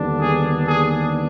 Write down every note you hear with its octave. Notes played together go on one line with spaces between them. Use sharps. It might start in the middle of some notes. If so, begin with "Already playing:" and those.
Already playing: D#2 D3 G3 B3 D4
G#4
G#4